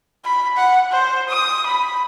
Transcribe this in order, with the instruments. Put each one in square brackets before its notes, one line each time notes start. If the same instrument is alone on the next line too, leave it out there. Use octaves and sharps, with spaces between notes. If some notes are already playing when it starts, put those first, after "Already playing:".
[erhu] B5
F#5
C5
D#6
B5